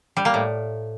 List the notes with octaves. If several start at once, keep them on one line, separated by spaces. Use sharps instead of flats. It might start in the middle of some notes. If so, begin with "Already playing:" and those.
G3
A#3
A2